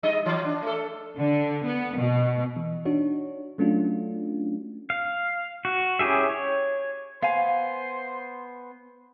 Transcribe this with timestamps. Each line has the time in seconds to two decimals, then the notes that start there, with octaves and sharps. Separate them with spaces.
0.03 G3 D#4 D#5
0.26 E3 F#3
0.44 D4
0.62 A3 A4
1.18 D3
1.66 B3
1.98 B2
2.57 E3
2.85 D4 D#4 F#4 C#5
3.58 F#3 A3 C#4 D4 F4 F#4
4.90 F5
5.65 F#4
5.99 C#4 E4 G4 G#4 E5
6.29 C#5
7.22 B3 C5 F5 G#5